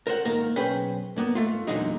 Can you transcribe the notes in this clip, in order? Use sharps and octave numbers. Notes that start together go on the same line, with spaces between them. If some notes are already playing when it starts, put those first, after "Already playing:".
A#4 C5 F#5
G#2 D#3 A#3 A#4
B1 C#4 G#4 B4 C5 G5
G2 A#3 B3
G#2 A3 F4
E2 A#2 D3 F#3 G#3 D#4